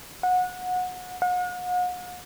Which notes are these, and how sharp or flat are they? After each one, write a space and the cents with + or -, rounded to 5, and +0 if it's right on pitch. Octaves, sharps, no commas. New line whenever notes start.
F#5 -25
F#5 -45